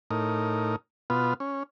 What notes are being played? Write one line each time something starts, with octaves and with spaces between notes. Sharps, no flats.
A2 D#4 A#4
B2 B3 F4
C#4